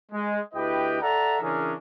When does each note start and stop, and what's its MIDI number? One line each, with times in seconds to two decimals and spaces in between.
0.12 0.38 56
0.54 1.01 38
0.54 1.01 64
0.54 1.01 67
0.54 1.01 71
0.54 1.01 75
0.54 1.01 79
1.01 1.37 69
1.01 1.37 74
1.01 1.37 76
1.01 1.37 78
1.01 1.37 81
1.01 1.37 82
1.41 1.73 49
1.41 1.73 52
1.41 1.73 61
1.41 1.73 62
1.41 1.73 68
1.41 1.73 70